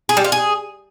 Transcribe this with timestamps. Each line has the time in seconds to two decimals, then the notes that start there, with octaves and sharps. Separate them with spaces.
0.09 G#4
0.17 G3
0.24 F4
0.32 G#4